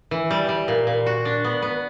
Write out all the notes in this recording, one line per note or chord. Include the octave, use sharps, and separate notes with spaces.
E3
G3
G3
A#2
A#2
F#4
D4
B3
B3